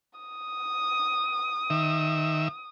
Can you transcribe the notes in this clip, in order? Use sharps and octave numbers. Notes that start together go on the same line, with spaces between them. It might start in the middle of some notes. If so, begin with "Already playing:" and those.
D#6
D#3 E5